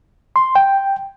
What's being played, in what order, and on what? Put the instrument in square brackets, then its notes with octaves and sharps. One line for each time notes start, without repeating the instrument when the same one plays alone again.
[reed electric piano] C6
G5